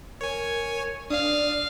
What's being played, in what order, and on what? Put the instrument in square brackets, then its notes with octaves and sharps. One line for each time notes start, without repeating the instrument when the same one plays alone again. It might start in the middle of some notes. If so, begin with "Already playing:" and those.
[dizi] A#4 [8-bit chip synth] C#5 G#5
[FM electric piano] D4 [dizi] D5 [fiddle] F5 [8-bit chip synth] D#6